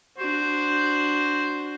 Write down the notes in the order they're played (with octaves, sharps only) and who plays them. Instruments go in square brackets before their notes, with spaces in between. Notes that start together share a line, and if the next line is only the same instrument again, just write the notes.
[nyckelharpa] D4 F#4 [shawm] C5